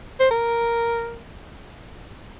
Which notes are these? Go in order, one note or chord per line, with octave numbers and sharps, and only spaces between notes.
C5
A#4